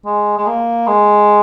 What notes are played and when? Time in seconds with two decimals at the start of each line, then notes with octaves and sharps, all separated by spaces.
0.05 G#3
0.38 G#3
0.47 A#3
0.87 G#3